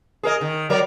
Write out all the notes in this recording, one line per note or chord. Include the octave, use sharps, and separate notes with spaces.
G#4 A#4 D#5
D#3
F#3 A#4 D5